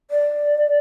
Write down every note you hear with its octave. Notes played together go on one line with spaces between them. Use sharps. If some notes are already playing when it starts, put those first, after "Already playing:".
D5